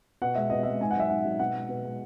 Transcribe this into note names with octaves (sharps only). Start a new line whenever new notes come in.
B2 F#5
G#3 E5
B2 D#5
E5
G#3
G#2 G#5
F#5
F#3 E5
G#2 F#5
F#3
B2 F#5
G#3
B2
G#3